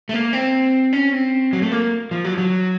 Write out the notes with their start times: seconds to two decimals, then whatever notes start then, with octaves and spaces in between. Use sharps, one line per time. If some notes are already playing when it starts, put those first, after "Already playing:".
0.09 A3
0.14 A#3
0.33 C4
0.93 C#4
1.12 C4
1.53 F#3
1.62 A3
1.72 A#3
2.11 F3
2.24 F#3
2.34 F3
2.38 F#3